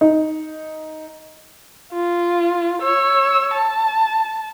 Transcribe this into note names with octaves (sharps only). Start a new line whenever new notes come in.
D#4
F4
C#5 E6
A5